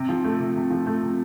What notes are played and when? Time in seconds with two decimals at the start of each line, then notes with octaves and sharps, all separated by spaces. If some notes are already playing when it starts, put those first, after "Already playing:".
Already playing: C3
0.09 F3
0.24 A3
0.40 C3
0.56 C3
0.70 F3
0.86 A3
1.03 C3